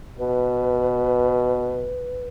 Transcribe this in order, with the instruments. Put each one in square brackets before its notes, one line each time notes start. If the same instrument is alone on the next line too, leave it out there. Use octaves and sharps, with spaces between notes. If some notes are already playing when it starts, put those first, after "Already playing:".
[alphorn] B2 [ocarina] B4